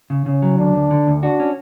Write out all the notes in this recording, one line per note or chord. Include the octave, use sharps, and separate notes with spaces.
C#3
C#3 C#4
F#3
D2 D4
D2
D3
D2
D4 F#4
C#4